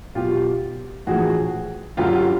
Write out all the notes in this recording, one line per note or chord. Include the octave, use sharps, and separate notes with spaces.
B1 B2 F4 G4
A#1 A2 E3 F#4 G#4
G1 F#2 D3 F4 G4